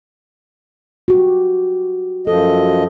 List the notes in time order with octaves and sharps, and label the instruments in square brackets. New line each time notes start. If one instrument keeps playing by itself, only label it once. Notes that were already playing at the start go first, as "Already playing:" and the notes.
[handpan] F#4 G4
[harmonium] F#2 F3 D#5 [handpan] A4